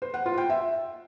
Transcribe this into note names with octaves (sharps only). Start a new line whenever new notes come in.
C5
F#5
F4
G5
E5